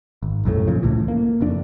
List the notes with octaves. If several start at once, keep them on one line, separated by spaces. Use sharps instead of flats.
G#1
B1 F#2 A2 A3
A#2 C#3 F3
C#2 A2 E3
A#3
F#1 F2 D4